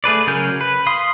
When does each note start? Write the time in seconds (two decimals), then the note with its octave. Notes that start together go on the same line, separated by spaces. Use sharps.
0.04 A3 G#4 B4 D5
0.27 C#3 F#3 A#4 G#5 G6
0.61 B4
0.86 F5 B5 C6 D#6